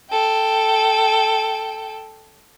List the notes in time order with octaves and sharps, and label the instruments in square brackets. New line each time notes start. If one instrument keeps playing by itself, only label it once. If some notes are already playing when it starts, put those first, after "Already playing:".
[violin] A4 G5